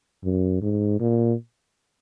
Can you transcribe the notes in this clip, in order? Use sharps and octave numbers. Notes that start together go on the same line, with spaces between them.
F#2
G#2
A#2